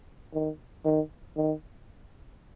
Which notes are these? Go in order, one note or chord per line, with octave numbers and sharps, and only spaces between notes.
D#3
D#3
D#3